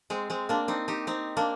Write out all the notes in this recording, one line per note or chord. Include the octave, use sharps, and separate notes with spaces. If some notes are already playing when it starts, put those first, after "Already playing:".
G#3 C4
G#3 C4
A#3 D4
C4 D#4
D#4 G4
C4 D#4
A#3 D4